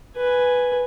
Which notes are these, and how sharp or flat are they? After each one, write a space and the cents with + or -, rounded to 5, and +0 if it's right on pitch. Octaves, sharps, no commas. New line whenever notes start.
B4 +0 G#5 +0